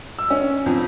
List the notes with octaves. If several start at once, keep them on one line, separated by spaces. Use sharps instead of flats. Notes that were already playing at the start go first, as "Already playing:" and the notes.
E6
C#4
F2